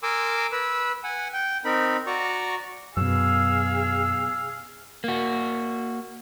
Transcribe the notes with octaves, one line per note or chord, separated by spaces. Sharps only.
A#4 G#5 C6 D6 E6
B4 E6
F#5 G#5
G5
C4 D#4 A#4 B5
F#4 D5 A#5 C#6
F#2 B2 F#3 G#4 F5 E6
A#3 F#4